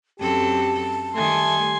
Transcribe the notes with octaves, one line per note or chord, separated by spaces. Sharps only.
F#2 C4 G4 A4 A5
D#3 G3 A3 G#5 C6